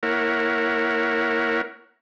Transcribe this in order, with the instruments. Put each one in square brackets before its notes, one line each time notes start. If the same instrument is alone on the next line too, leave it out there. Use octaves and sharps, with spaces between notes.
[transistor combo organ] A#3 E4 A#4 C#5 F#5